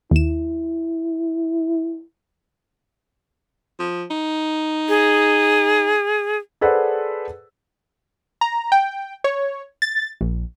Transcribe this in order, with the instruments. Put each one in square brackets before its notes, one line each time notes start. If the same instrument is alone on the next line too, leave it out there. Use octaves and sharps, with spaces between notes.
[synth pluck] D#2 E7 [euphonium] E4
[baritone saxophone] F3
D#4
[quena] G#4
[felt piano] G#4 A4 B4 C5 D5 F#5
[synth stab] A#5
G5
C#5
A6
A#1